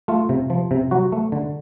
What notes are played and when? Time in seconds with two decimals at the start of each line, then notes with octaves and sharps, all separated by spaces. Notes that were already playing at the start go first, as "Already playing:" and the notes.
0.08 A3 F4
0.29 C3
0.50 F3
0.71 C3
0.91 F#3 F#4
1.12 A3
1.32 D3